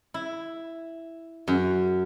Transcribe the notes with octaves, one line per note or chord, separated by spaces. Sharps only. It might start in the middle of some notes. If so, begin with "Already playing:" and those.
E4
F#2